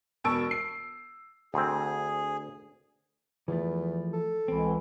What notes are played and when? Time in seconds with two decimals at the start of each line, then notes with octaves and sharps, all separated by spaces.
0.24 E1 B2 A5 C#6 E6 D7
0.51 C7
1.54 D2 C4 G#4
3.48 E2 E3 F3 A3
4.13 A4
4.48 C#2 E3 C4